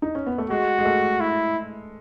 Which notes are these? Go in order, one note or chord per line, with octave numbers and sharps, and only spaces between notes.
D#4
C#4
B3
A3
G#3 F#4
G#3
A3
E4